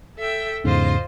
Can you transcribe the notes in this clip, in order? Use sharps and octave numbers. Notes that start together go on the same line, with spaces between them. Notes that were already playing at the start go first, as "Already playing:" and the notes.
A4 E5 G5
E2 G#2 C#3 F4 C5 D#5